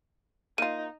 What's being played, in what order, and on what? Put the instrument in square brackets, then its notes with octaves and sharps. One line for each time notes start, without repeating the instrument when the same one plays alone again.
[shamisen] A#3 F4 [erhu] D#4 [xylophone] D#7